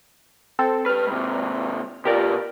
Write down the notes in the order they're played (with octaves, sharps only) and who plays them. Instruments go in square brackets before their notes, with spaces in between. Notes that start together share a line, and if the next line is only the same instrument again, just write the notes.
[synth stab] C4 A4
[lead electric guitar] G4 B4 [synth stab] F6
[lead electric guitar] G#2 C3
[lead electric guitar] B2 F4 [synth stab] G4 A#4 D5